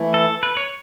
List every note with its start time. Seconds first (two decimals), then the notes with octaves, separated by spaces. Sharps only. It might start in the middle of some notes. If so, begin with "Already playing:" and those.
Already playing: E3 A3 E4
0.14 A4
0.43 B4
0.57 C#5